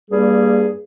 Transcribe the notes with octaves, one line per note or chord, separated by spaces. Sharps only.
G2 G3 A#3 G#4